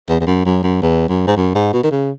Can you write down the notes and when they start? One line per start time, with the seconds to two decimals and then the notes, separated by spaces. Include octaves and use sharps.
0.09 E2
0.20 E2
0.27 F#2
0.46 F#2
0.63 F#2
0.82 E2
1.09 F#2
1.27 G#2
1.37 F#2
1.55 G#2
1.73 B2
1.83 D#3
1.91 C#3